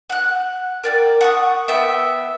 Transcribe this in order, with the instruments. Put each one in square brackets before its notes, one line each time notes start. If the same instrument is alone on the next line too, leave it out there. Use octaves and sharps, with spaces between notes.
[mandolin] F#5 F#6
A#4 D5 G5
F#5 C#6 D#6
B3 E5 G5